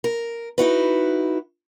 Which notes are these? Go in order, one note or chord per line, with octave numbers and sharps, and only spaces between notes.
A#4
D#4 E4 F#4 B4